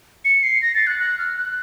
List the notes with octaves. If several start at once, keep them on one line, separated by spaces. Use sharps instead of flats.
C#7
C7
A#6
A6
F#6
F#6
F6
F#6